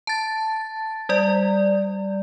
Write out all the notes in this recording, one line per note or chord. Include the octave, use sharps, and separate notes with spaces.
A5 A6
G3 D5